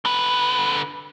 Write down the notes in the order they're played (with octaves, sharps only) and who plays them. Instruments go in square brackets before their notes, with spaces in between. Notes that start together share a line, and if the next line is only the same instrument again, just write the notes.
[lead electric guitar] D3 B4